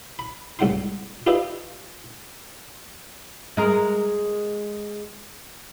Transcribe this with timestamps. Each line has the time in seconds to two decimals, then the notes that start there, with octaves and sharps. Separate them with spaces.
0.19 B5
0.59 C2 G#2 F#5 G5 C6
1.26 F4 G4 B4 C5 D#5 E5
3.57 G#3 A#4